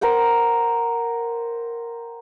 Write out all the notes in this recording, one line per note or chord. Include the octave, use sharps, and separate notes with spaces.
A#4 C5 F#5 G5